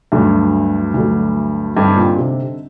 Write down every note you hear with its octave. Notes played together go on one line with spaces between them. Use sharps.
D2 G2 D3 F#3 A3
D2 D3 F#3 A3
G2 D3 G3 C4 D#4 A4
A#2
C3